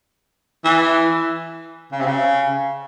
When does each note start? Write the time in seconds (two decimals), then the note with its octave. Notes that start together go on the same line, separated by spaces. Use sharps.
0.64 E3
1.92 C#3
2.00 C3
2.06 C#3